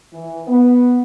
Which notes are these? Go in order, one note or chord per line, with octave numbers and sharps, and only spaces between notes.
E3
B3